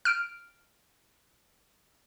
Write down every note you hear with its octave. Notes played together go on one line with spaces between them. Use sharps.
F6 D7